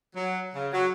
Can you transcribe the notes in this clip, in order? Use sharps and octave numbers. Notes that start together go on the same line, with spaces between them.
F#3
C#3
F#3